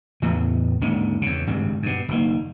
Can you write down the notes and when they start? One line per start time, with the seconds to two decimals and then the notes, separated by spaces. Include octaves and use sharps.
0.22 E2 A2 C#3 B3
0.81 G#1 D#2 D3 C#4
1.22 E2 C#3
1.47 G#1 G2 C#3 G3
1.83 G2 B2
2.09 F#1 D#3 A#3